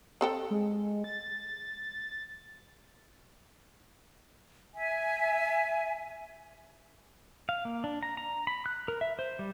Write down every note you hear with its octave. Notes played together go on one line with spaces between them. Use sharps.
C4 A4 G5
G#3
A6
E5 G#5
F5
A#3
D4
A#5
A#5
B5
F#6
A#4
E5
C5
G3